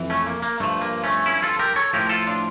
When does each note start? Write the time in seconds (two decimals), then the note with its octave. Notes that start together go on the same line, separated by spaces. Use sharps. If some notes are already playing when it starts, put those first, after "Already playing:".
Already playing: F2 E3
0.10 A3 C#4
0.26 A#3
0.42 A#3
0.60 G2 F3 A3
0.82 A#3
1.04 A3 C#4
1.26 C#4 E4
1.43 F4 A4
1.59 G4 A#4
1.76 A4 C#5
1.93 A2 F3 G4 A#4
2.09 F4 A4
2.27 D4 F4